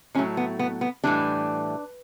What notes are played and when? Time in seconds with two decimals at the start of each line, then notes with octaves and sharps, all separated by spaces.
0.15 A2 F#3 A3 C#4
0.37 B3
0.59 B3
0.81 B3
1.04 A2 E3 G3 D4